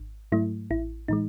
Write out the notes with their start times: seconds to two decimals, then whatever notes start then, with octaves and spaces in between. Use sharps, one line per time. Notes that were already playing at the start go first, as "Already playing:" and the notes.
Already playing: G#1
0.32 G#2 F#3 A3 E4
0.70 A1 E4
1.08 A2 E3 G#3 D#4